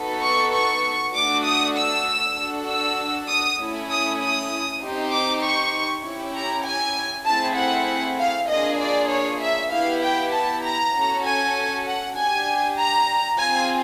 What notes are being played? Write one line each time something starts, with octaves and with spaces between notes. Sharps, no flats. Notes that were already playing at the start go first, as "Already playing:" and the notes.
Already playing: B3 D#4 F#4 A4
C#6
C#6
A3 D4 F#4 D6
D#6
E6
D4 F#4 A4
E6
D#6
A3 C#4 E4
D#6
D#6
C4 D#4 G4
D6
C#6
C#4 E4 G4
A#5
G#5
A3 C4 E4 G#4 A5
F#5
F5
A#3 D4 F4 G#4 D#5
D5
C#5
E5
B3 E4 G4 F5
G5
A5
A#5
C#4 F#4 A4
G#5
F#5
D4 G4 G#5
A#5
C4 F4 G#4 G#5